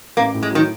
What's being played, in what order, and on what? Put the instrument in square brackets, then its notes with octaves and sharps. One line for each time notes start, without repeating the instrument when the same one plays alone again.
[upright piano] A1 [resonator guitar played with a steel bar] A#3
[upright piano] A2
[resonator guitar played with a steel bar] G#3
[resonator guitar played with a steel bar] D#3 [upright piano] F#3